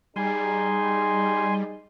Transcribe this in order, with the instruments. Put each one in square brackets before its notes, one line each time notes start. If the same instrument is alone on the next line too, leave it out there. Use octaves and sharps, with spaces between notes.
[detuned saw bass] G3 [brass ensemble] D#4 G#4 [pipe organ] G#5 C6